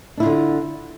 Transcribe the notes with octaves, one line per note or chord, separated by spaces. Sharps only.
D3 D4 E4 F4